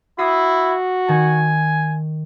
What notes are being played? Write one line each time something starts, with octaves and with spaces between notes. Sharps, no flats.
E4 F#4 D#6 E6 C7
D#3 G#5